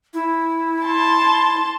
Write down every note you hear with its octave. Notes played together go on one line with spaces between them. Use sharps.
E4
A5 C6